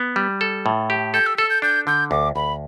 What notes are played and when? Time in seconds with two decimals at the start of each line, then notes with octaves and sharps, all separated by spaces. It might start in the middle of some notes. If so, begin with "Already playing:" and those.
Already playing: B3
0.16 G3
0.41 A4
0.66 A2
0.90 G4
1.14 A4 G6
1.26 E6
1.38 A4 E6
1.50 G6
1.62 D4 G6
1.87 D3 G6
2.11 D2 D6
2.35 D2 B5